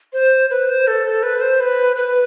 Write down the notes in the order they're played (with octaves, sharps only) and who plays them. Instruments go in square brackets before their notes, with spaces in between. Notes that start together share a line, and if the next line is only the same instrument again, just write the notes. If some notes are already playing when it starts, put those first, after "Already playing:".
[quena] C5
B4
C5
A4
B4
C5
B4
B4